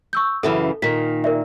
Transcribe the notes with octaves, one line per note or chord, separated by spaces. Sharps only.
C#6 E6 G6
F#2 C#3 E3 A4
A#2 D#3 B6
A#4 D5 E5